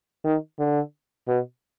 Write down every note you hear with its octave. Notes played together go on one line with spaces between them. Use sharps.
D#3
D3
B2